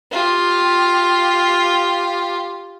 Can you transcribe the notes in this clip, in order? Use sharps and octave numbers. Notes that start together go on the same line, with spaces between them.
F4 G4